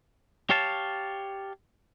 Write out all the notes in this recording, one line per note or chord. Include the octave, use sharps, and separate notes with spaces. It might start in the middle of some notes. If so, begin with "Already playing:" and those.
G4 C#5 F5 A5